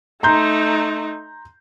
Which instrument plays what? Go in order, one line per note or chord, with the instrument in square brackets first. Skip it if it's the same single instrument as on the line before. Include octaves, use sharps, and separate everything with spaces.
[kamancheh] A3 D#4 [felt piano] A#5 C6 G6